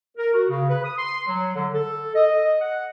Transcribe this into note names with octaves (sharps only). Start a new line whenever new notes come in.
A#4
F#4
C#3
B4
D#6
C6
F#3
D3
A4
D#5
F#5